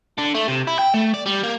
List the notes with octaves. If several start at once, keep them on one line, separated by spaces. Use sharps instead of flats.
D3
A3
C3
E4
G5
A3
D5
G3
A#3